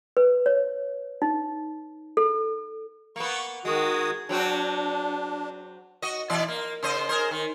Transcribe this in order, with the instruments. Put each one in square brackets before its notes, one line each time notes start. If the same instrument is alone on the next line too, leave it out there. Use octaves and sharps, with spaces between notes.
[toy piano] B4
C#5
D#4
A4
[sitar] A#3 B3 [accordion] C#6
[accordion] D#3 F#4 D#6 [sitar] G#3
[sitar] F#3 C4 F#4 [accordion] D4
[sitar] F#4 D#5
B2 E3 D5
A#3
C#3 C5 D#5
G#4 A#4 C5
D#3